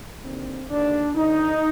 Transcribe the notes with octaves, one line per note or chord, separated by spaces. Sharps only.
D#2 D3 C4
D#2 D3 D4
D2 D3 D#4